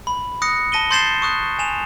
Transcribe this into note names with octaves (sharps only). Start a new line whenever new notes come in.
B5
D#6 F#6 A#6 C#7
A5 A#6 D#7 G7
C6 G6 A6 C7 E7 G7
C#6 D#6 F#6
G#5 E7 F7